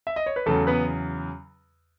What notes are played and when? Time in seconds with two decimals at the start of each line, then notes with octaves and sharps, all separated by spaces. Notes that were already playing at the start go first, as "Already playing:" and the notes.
0.07 E5
0.16 D#5
0.26 C#5
0.36 B4
0.46 E2 C#3 F#3 A3 A4
0.67 B3 B4